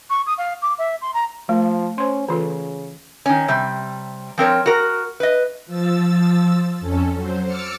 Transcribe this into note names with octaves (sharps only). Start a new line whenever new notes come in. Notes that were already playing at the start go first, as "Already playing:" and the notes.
C#6
D#6
F5
D6
E5
C6
A#5
F3 A3
C#4 C5 C6
C#3 E3 F4 A4
D#3 C#4
C3 G3
F3 C4 A#4 C#5
F#4 A#4
B4 D#5
F3 E6 A6
F2 C#4 A4
F#3 C5
D6 E6 F6 A6 C#7